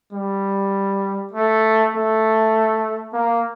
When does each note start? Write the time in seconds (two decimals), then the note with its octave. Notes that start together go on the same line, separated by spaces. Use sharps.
0.13 G3
1.33 A3
1.93 A3
3.13 A#3